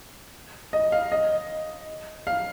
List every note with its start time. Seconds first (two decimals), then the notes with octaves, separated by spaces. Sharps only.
0.73 D#5
0.92 F5
1.12 D#5
2.27 F5